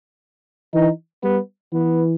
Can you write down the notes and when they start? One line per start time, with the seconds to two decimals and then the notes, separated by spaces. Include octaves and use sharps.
0.74 E3 D#4
1.23 G3 B3
1.73 E3 B3